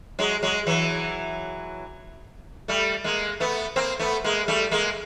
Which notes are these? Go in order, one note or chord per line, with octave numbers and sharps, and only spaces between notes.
F#3 G#3
F#3 G#3
E3 F#3
G3 A3
G#3 A#3
A3 B3
A#3 C4
A3 B3
G#3 A#3
G3 A3
G#3 A#3